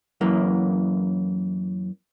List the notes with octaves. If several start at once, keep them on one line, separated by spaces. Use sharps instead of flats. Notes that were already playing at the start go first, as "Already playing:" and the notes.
F#2 E3 A#3